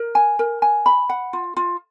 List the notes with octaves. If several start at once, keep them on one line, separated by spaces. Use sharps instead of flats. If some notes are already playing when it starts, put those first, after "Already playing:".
Already playing: A#4
G#5
A#4
G#5
B5
F#5
F4
F4